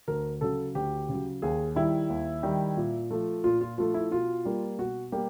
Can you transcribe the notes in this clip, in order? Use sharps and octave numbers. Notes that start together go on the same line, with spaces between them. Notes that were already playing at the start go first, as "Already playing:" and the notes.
D2 A#4
C#3 F#3 A4
D2 G4
C#3 F#3
D#2 G#4
D#3 G3 E4
D#2
D#3 G3
A#2
F3 A3
A#2 F4
F4
F3 A3 F4
E4
B2 F4
G3 A#3
B2 F#4
G3 A#3 G4